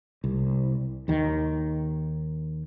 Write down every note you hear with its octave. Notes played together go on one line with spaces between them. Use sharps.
C2
D#2 D#3